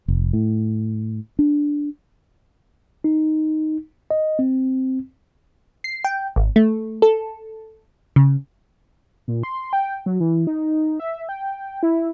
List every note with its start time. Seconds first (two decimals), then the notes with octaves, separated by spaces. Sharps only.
0.08 F1
0.33 A2
1.39 D4
3.04 D#4
4.11 D#5
4.39 C4
5.84 C7
6.04 G5
6.36 G#1
6.56 A3
7.02 A4
8.16 C#3
9.28 A#2
9.43 C6
9.73 G5
10.06 F#3
10.20 E3
10.47 D#4
11.00 E5
11.29 G5
11.83 E4